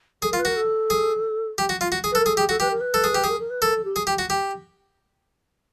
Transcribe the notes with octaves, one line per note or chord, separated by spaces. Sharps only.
G#4 A4
A#4
F4
B4
F#4 A#4
A4
G#4
G4
F#4
F4
F#4
G#4
B4
A4
A#4
G#4 A4
G4 G#4
F#4 A4
G4 B4
A#4
B4
A4
G#4
G4
G#4 A#4
A#4
B4
A4 A#4
A4
G4
G#4
G4
F#4
G4